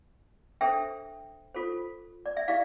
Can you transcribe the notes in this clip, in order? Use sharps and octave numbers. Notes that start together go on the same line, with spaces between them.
D4 A4 C5 E5 G5
F4 A4 C5
D5
E5
E4 G4 D5 F5